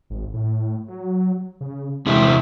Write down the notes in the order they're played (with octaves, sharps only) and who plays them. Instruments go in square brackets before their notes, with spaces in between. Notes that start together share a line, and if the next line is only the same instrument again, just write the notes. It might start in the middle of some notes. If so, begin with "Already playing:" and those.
[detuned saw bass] G#1
A2
F#3
C#3
[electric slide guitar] E2 C3 E4 [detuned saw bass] G#3